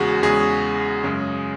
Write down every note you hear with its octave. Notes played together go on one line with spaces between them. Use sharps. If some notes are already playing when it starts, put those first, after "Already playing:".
Already playing: E2 C#3 G#3 F#4 G#4
E2 C#3 G#3 G#4
F#2 C#3 G#3